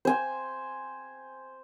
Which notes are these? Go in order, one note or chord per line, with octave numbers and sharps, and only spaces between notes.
C5 G#5